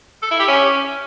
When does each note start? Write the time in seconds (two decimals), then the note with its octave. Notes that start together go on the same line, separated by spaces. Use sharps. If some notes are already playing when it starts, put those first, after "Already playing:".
0.23 A4
0.31 E4
0.39 G4
0.48 C#4